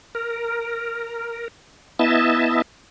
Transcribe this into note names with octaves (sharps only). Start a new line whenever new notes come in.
A#4
B3 E4 D#5 E5 A5